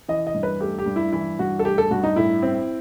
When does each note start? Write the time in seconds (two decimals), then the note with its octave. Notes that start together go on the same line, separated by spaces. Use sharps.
0.08 E3 D#5
0.27 D#5
0.34 G2
0.43 B4
0.60 A3 G4
0.79 G4
0.86 G2
0.96 E4
1.13 E3 E4
1.39 G2 F#4
1.59 A4
1.64 A3 G4
1.78 A4
1.91 G2 F#4
2.04 D#4
2.16 A2 E4
2.43 C4